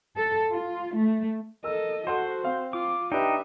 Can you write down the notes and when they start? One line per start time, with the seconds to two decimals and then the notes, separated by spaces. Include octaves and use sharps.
0.17 A4
0.51 F4
0.95 A3
1.64 A4 A#4 D#5 E6
2.07 F#4 A4 C5 F#5 C6
2.44 C4 F5
2.73 F4 D6
3.12 D4 D#4 G4 B4 E5 G5